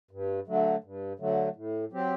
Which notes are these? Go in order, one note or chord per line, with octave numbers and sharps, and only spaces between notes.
G2
D3 F#3 A3
G2
D3 F#3 A3
A2
F#3 C4 G4